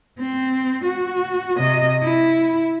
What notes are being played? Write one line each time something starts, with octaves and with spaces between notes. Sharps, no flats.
C4
F#4
C3 D#5
E4